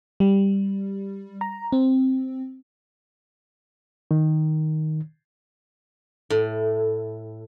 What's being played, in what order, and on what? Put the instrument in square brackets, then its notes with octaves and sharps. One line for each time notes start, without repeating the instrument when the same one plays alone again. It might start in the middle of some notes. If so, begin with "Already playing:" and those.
[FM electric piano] G3
A#5
C4
[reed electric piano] D#3
[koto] A2